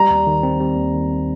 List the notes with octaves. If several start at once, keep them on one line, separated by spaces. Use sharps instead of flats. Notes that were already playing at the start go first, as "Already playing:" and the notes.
Already playing: G3 A#5
D#2
D#3
C4
G3
D#2
D#3
C4